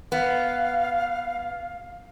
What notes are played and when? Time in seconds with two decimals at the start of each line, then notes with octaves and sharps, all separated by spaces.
0.12 B3 F5